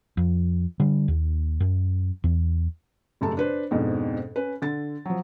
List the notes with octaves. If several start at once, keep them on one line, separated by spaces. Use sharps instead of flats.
F2
D3 G3
D#2
F#2
E2
F1 F#2 C#3 A3 A5
D4 B4 C5
F2 G#2 B2 D4
C#4 B4
D3 A6
F3 F#3